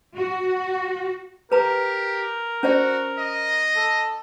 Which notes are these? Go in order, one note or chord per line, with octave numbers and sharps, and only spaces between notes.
F#4
G4 A#4 B4 A#5
C#4 F#4 C5 D5
D#5
A4